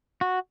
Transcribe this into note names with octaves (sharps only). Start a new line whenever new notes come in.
F#4